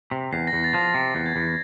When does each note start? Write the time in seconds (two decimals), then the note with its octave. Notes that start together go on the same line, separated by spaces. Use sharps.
0.11 C3
0.33 E2 C7
0.47 A#6
0.53 E2
0.64 A6
0.74 F3 A#6
0.94 C3
1.15 E2
1.26 G#6
1.36 E2